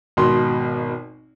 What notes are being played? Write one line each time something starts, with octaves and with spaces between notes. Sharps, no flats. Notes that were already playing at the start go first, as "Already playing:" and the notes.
G#1 B2 C6